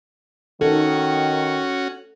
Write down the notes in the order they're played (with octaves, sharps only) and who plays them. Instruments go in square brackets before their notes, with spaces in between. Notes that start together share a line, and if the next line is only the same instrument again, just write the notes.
[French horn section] D#3 [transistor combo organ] C#4 F#4 [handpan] A4